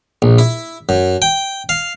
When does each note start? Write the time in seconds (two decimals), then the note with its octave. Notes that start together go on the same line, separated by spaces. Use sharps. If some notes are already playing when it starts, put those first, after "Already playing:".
0.22 A#1
0.38 E4
0.89 F#2
1.22 G5
1.69 F5